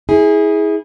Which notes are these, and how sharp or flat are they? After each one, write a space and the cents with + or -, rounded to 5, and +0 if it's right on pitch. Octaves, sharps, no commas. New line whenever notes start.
E4 -30 G#4 +0